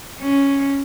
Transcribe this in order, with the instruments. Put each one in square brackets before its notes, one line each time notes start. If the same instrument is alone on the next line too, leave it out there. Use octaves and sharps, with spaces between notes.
[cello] C#4